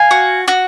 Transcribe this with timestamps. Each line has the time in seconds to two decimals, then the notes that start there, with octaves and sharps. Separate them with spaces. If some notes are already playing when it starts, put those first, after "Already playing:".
Already playing: F5 G#5
0.11 F#4
0.48 F#4